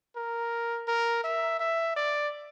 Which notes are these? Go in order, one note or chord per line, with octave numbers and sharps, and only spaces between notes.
A#4
A#4
E5
E5
D5